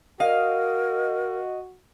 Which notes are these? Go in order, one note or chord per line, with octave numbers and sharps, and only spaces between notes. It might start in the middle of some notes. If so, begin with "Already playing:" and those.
F#4 A#4 D#5 F5